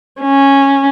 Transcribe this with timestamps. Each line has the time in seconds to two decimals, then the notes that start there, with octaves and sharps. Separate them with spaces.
0.21 C#4